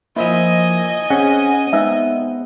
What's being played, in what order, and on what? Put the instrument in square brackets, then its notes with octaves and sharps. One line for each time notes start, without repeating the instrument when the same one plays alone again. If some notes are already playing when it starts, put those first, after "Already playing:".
[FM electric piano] F3 E4 [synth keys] A#3 C5 E5 [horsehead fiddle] D#5 G#5
[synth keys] C4 [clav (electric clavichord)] C#4 [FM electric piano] G#4 F#5
[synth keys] G#3 B3 C4 [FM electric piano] D#4 [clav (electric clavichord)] E5